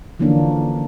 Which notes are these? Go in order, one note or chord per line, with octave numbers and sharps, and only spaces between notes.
D3 E3 F3 A#3 C#4 D4